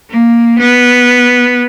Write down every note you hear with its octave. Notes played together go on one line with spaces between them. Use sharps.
A#3
B3